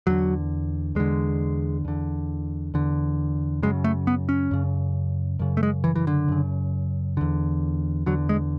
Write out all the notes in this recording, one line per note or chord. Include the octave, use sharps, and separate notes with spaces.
E2 D3 F#3
E2 D3 G#3
E2 D3
E2 D3
F#2 C#3 G#3
A3
B3
C#4
F#2 C#3
F#2 C#3
A3
G#3
E3
E3
D3
F#2 C#3
E2 D3
E2 D3 F#3
G#3